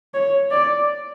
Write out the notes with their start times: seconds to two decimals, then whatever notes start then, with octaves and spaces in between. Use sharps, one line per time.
0.14 C#5
0.51 D5